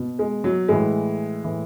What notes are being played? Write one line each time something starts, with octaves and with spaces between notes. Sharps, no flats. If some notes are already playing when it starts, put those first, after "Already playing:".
Already playing: B2
G#3
F#3
A2 E3 G#3
A2 E3